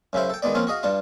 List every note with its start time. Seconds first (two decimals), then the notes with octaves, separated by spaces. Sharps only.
0.13 F#2 C#3 E4 C5
0.30 A4 G5
0.42 D#3 G#3 B3 D5
0.55 F3 A#3 C4 C#4 F4
0.67 F#4 G#4 D#5 F5
0.83 G2 D4 F4